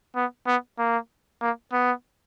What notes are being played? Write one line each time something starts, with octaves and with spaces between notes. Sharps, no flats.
B3
B3
A#3
A#3
B3